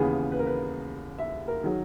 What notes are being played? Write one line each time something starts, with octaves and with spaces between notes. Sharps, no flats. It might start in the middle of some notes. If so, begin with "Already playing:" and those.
Already playing: D#2 C#3 E3 B3 G#4
B4
A#4
B4
E5
A#4
D#3 F#3 G#4